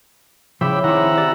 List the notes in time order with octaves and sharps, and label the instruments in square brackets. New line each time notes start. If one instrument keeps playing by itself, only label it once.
[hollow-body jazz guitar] C#3 F3 [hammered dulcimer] E4 C#5 [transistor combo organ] E5 G5 B5 [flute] D6
[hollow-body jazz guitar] D#3 [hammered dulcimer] C4 G#4 [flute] E4 [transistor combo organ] E5 F#5 A#5
[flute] G4 [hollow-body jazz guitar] D5